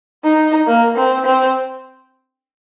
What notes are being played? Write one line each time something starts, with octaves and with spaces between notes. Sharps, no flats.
D#4
A#3
C4
C4